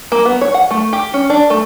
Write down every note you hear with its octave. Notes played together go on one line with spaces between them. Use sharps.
A#3
B3
C#5
F#5
A3
G4
C#4
D4
A3